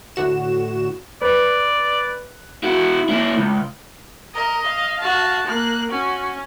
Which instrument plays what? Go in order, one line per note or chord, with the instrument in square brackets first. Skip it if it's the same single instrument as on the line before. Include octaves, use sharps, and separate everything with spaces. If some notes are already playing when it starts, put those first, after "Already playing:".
[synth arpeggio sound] A2 D3 F#4 E7
[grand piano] B4 [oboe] D5
[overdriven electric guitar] E4 F#4
A#3 E4
C#2
[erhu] A#4 [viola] D#5
[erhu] F5
[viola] F#4 A5
[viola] A#3 [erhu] F#6
[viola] C#4 [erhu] F#4